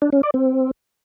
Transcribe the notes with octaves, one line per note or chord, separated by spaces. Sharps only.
D4
C#4
D5
C4